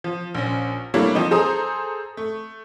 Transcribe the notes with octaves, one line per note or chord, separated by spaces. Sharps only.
F3
A#1 C#4
G3 A3 A#3 D4 E4 C#5
F3 C4 D#4
G#4 A4 C5 A#5 D#6
A3